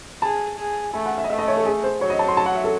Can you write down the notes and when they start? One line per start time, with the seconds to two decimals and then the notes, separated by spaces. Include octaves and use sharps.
0.22 G#4 A5
0.59 G#4
0.94 A3 G#5
1.06 F#5
1.18 E5
1.24 D#5
1.30 A3 E5
1.38 D#5
1.48 C#5
1.57 A4
1.66 G#4
1.83 C5
2.01 F#3 C#5
2.10 D#5
2.19 A5
2.28 C6
2.37 A5
2.46 F#5
2.55 E5
2.64 A4